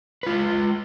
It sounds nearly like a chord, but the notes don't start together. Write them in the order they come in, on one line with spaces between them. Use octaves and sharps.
B4 F4 G#3